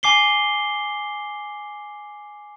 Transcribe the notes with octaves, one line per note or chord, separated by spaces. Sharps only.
G#5 D6 C7 G7